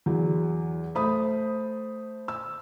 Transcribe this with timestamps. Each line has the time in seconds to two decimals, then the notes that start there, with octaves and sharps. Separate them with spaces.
0.06 E2 F#3
0.95 A3 C5 B5 D#6
2.28 E6